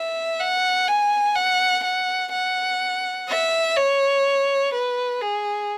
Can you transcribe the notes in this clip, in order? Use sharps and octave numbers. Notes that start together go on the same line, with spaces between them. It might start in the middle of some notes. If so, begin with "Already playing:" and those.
Already playing: E5
F#5
G#5
F#5
F#5
F#5
E5
C#5
B4
G#4